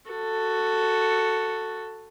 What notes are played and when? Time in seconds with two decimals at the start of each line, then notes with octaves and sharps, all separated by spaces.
0.10 F#4 A4